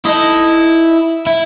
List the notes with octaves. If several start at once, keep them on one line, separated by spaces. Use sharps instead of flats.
D#4 E4 A4 D#5
E4